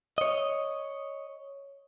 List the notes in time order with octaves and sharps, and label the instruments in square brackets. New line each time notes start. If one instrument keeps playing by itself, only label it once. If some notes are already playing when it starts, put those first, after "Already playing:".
[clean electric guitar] C#5 D#5